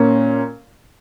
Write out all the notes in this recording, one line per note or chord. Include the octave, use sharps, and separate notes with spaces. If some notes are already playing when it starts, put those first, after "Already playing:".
Already playing: A#2 A#3 C#4